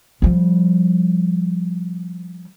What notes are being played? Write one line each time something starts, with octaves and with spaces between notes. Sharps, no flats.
F3 G3